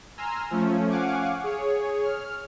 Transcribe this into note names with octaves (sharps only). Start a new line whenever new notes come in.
G#5 A#5 C6 E6 F6
F3 A3 C#4
F5 F#5 G#5 C#6 D6
G#4 C#5
F6